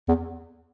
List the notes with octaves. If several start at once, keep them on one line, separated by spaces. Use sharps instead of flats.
E2